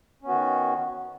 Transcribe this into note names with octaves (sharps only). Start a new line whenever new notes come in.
D#3 B3 C#4 F#4